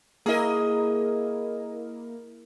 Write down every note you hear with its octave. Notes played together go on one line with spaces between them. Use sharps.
A#3 E4 G#4 A#4 D#5